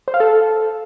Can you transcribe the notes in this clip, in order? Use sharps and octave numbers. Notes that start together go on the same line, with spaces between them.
C5
F5
A4